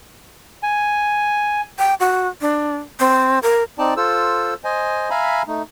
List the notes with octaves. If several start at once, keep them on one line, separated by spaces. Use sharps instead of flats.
G#5
G5
F#4
D4
C4
A#4
C4 D#4 D5 A5
F4 A4 C5 E6
C5 D#5 G#5
E5 F5 G#5 A#5 B5
A3 D#4